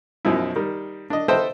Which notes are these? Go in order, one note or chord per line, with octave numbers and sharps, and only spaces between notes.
F#2 B2 F3 D#4 E4
D#3 G3
D4 D#5
A4 B4 C5 D#5 E5 G5